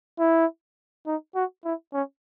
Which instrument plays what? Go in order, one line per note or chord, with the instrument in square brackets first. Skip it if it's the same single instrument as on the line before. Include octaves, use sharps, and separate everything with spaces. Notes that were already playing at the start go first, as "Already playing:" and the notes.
[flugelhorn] E4
D#4
F#4
E4
C#4